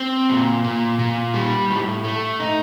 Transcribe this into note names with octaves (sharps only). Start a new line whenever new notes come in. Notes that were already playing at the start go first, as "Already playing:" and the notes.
Already playing: C4
A#2
A#2
A#2
G3
A2
A3
D#4